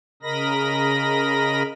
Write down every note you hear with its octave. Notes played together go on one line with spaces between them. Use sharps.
C#3 A#4 D#5 B5 A#6